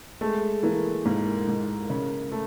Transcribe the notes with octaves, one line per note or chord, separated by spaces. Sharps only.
G#3 A3 G#4
E3 A#3 A#4
G#2 A#3 A#4
G#2
C#3
A3